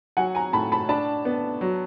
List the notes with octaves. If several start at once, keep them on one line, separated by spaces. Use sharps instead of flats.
F#3 F#5 G#5
G#5 A#5
A2 A5 B5
A5 B5
D4 A5 B5
B3
F#3